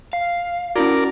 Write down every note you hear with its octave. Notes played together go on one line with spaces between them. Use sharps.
F5
C#4 E4 F#4 A#4 D5